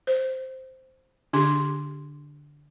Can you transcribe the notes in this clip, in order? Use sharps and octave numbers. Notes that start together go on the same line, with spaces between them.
C5
D3 D4 G4 C6